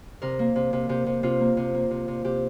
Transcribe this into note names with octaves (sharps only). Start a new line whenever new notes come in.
C3 A#4
A#3
C3
C3
C3 G4
C3
C3 F4
A#3
C3
A#3
C3
C3
C3 G4